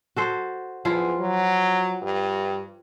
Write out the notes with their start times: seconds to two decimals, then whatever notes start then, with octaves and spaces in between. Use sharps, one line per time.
0.16 F#4 A4 C5
0.85 E2 F3 E4 F4
1.20 F#3
2.02 G2